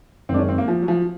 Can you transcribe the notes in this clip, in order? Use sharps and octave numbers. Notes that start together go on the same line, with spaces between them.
F#2 D#3 G#3 C4 D4
C#4
C4
A#3
F3
F#3
F3